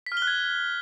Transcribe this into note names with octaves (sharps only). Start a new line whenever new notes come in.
B6
F6
G7
F#6
G#6